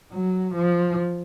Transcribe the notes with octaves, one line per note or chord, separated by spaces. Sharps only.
F#3
F3